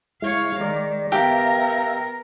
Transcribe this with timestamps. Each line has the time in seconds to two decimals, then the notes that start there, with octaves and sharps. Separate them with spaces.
0.22 G#3 E4 C#5 F5
0.61 D#3 G#3 D5
1.12 B3 G4 A#4 E5 F5